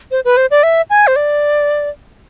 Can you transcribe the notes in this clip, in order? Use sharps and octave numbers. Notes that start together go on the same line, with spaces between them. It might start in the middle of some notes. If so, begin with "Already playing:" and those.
C5
B4
C5
D5
E5
G#5
C5
D5